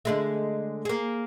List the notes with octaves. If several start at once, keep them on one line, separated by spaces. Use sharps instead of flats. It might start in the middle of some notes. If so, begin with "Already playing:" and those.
D3 G#3 A3
A#3 G#4